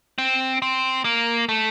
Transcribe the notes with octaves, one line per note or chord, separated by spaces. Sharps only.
C4
C4
A#3
A3